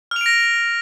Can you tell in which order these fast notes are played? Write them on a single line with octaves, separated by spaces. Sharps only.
F6 F7 D7 A#6